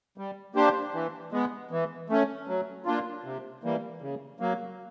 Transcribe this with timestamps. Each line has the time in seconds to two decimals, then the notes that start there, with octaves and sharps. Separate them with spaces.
0.18 G3
0.55 A#3 D4 G4 C5
0.94 E3
1.32 G#3 B3
1.71 E3
2.10 A3 C#4
2.48 F#3
2.85 A#3 D4 F4
3.24 C3
3.63 E3 G3 A#3
4.02 C#3
4.40 F#3 A#3